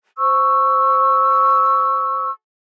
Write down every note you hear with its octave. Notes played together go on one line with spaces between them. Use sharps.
C5 C#6 E6